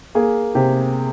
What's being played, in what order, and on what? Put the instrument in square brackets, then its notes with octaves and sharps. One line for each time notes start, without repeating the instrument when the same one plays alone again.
[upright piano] A#3 G#4
C3 G4